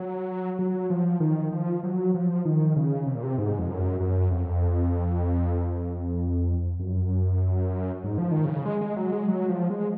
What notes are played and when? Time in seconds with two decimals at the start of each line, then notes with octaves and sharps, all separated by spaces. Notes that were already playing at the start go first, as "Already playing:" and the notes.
Already playing: F#3
0.59 F#3
0.90 F3
1.20 D#3
1.52 F3
1.83 F#3
2.14 F3
2.45 D#3
2.76 C#3
3.06 C3
3.15 A#2
3.23 C3
3.38 G#2
3.59 F2
3.69 F#2
4.00 F#2
4.31 F2
6.80 F#2
8.04 G#2
8.18 F3
8.31 D#3
8.45 C#3
8.65 G#3
8.81 G#3
8.96 F#3
9.12 G#3
9.28 F#3
9.49 F3
9.70 G#3